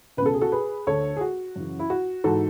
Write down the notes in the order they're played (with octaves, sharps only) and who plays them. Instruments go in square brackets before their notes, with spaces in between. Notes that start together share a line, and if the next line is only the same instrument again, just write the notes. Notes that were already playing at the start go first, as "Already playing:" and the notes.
[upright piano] C#2 B4
B2 A4
G#4
F#4 A4
G#4 B4
D2 D3 A4 C#5
G#4
F#4
F#2 C#3 E3
E4
F#4
G#2 E3 F#4 A4